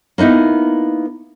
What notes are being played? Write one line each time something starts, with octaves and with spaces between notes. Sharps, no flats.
A#3 B3 D#4 E4 A#4